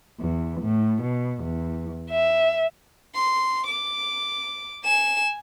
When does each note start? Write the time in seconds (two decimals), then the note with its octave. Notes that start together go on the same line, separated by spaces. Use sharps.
0.20 E2
0.61 A2
1.02 B2
1.42 E2
2.11 E5
3.15 C6
3.67 D6
4.84 G#5 E7